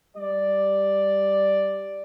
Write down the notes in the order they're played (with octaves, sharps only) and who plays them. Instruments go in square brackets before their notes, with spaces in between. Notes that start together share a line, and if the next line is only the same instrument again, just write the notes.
[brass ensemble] G3 D5